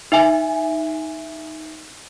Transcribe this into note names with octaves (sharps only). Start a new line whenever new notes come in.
D#4 E5 G#5